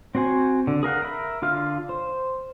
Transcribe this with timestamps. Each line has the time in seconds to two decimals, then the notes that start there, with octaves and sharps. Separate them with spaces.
0.15 C4 F#4 C5 G#5
0.67 D3
0.83 G#4 A#4 F5 F#5
1.02 A#4 E5 B5
1.42 D3 F4 F5 F6
1.89 C5